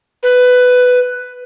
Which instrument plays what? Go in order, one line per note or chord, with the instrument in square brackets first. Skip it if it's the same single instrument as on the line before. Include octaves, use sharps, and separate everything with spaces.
[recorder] B4